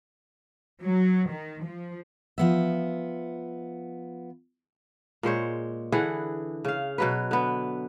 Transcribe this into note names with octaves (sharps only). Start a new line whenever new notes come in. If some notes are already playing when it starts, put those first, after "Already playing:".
F#3
D#3
F3
F3 B3 E5
A#2 G#3 C5 C#5
D3 E3 G#4 F#5
C#3 F5
B2 F#3 B4
D3 B3